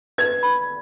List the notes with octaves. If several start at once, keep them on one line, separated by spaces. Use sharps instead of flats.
B4 G#6
B5